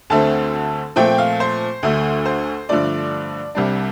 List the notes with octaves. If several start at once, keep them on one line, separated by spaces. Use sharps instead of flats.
D2 D3 A3 C4 A5
A#2 F3 A3 C4 G5
F5
C5
D2 D3 A3
C5
G2 D3 F3 A3 D5
C2 C3 G3 D4